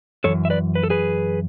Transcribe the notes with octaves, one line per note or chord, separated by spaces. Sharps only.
F#2 E3 A4 C#5
E5
B4 D5
B4
A4
G#4 B4